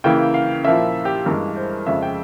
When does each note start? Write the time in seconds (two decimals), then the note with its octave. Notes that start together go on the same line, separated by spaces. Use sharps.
0.04 C#3 E3 A#3 E4 G5
0.34 F5
0.65 A#2 F3 A#3 E4 E5
1.05 G4
1.26 G2 E3 G#3 A#4
1.56 C5
1.87 F2 C#3 F3 G#3 E5
2.02 G5